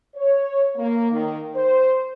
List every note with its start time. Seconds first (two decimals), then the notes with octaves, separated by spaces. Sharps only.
0.15 C#5
0.76 A#3
1.11 D#3
1.55 C5